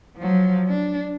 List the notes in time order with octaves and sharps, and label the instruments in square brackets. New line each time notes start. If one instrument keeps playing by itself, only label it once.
[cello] F3 F#3
D4